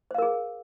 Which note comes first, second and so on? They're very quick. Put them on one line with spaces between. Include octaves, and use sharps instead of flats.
C5 F5 A#4 G#4